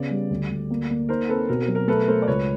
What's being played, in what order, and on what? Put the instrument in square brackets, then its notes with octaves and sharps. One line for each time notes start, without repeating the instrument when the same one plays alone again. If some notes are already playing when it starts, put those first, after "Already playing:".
Already playing: [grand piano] C#3 B3 [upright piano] D5
[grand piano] G3
D2
D2
A#3
A#3
[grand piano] D#4 [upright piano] A#4 C5
[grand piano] C4 [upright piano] A4 B4
[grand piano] B2 [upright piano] A#4
[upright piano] A#4
[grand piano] F#3
[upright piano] A#4
[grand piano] A3 [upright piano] A4 B4
[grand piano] A3 [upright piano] A#4 C5
[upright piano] D5
[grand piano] C#2 [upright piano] B4 C#5